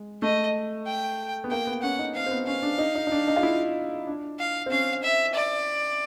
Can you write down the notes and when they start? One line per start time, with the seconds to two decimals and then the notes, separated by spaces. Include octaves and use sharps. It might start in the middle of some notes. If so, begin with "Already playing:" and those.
Already playing: G#3
0.22 A3 D#5
0.87 G5
1.44 B3
1.51 A#3 G5
1.67 B3
1.82 C#4 F#5
1.99 D#4
2.15 C4 F5
2.26 C4
2.31 B3
2.47 C#4 F5
2.63 D4
2.78 D#4
2.95 D#4
3.07 D#4
3.12 D4
3.28 D#4
3.36 F4
3.43 E4
4.07 D4
4.40 F5
4.66 C4
4.71 C#4 F5
5.03 E5
5.35 D5